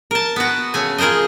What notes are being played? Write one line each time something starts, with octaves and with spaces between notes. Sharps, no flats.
A#4 A5
B3 F#4
C#3 A3 G#5
F4 G#4 A#4 C5 D#5